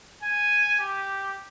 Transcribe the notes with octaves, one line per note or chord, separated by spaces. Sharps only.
G#5
G4